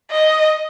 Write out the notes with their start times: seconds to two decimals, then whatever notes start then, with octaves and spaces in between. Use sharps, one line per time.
0.10 D#5